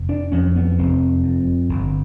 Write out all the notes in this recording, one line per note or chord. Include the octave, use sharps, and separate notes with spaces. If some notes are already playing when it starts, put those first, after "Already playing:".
Already playing: F1
D4
F2 C#4
B3
F1 C4
F2
G1